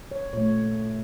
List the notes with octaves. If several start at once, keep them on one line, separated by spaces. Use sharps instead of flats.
C#5
A#2 A3 C#5